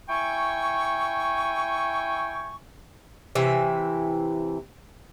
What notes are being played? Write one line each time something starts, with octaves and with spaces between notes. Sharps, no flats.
E4 G5 G#5 C#6
C3 E3 E5